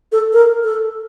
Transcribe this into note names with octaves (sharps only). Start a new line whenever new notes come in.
A4
A#4
A4